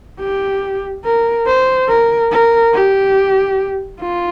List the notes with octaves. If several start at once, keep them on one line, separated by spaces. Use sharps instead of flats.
G4
A#4
C5
A#4
A#4
G4
F4